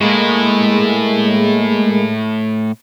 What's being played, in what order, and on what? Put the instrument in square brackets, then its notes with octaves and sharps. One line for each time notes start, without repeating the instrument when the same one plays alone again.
[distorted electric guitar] A2 E4 [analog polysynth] G#3 A#3